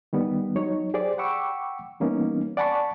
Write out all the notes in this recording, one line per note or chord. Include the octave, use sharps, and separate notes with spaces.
D#3 G3 B3
F#3 D#4 C#5
G4 G#4 C5 D5
F#5 G5 B5 C#6 D6 E6
E3 G3 A#3 B3 C#4 D#4
D5 F#5 G#5 A5 B5 C#6